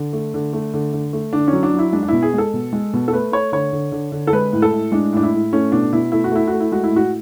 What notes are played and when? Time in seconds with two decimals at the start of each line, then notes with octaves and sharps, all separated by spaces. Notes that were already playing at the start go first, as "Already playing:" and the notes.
Already playing: D3
0.13 A3
0.34 D3
0.53 A3
0.74 D3
0.93 D3
1.13 A3
1.33 D3 D4
1.48 C#4
1.53 F#3
1.63 D4
1.74 F#3
1.79 E4
1.93 G#3 D4
2.03 D4
2.08 B2 E4
2.22 G#4
2.34 G#3 A4
2.54 B2
2.73 G#3
2.93 B2
3.08 A4
3.12 A3 B4
3.32 A3 C#5
3.52 D3 C#5
3.73 D3
3.92 D3
4.12 D3
4.27 A4
4.33 G#3 B4
4.53 A2
4.62 A4
4.72 A2
4.92 G#3 D4
5.13 A2 D4
5.23 E4
5.33 A2
5.53 A3 C#4
5.72 B2 D4
5.92 B2 E4
6.12 A3 E4
6.24 F#4
6.32 A3 E4
6.48 F#4
6.53 A3
6.60 E4
6.72 G#3 F#4
6.84 E4
6.91 A2 F#4